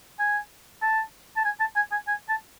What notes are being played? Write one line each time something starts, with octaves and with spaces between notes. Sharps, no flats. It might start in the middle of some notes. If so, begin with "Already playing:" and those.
G#5
A5
A5
G#5
A5
G#5
G#5
G#5
A5